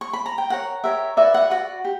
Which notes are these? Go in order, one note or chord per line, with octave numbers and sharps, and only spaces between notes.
C#6
B5
A#5
G5
G4 A#4 C#5 F#5
G4 A#4 C#5 E5
F#4 B4 D5 E5
F#5
F#4 B4 D5 F#5
G4